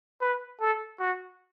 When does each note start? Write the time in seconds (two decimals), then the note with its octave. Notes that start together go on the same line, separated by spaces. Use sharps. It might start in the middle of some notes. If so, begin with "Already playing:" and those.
0.21 B4
0.60 A4
0.99 F#4